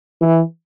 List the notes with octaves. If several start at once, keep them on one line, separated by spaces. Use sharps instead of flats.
E3